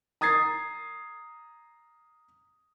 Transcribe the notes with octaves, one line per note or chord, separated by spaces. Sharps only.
A#5 D#6 G#6 A6 C7